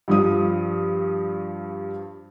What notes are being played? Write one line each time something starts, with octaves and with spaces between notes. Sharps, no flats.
G2 F3 D#6